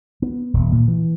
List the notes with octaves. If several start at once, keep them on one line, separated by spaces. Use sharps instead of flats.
B3
D#1
A#2
E3